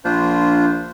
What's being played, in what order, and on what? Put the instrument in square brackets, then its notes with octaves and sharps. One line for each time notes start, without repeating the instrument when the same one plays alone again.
[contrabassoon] A#1 [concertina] D4 F4 C5